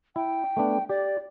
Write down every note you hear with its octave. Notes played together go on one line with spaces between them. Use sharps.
E4 G5
A3 B3 D4
G4 D5